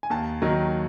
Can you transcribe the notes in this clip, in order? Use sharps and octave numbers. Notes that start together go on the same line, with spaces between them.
G#5
D#2 A5
D#3 F#3 A#5